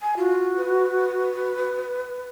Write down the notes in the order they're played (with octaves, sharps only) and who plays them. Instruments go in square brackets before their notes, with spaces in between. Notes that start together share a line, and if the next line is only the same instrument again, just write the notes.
[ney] G#5
[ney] F4 [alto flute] F#4
[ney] B4